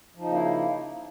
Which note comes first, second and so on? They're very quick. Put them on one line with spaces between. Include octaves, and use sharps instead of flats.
F3 D#4 C#3 A#3 E4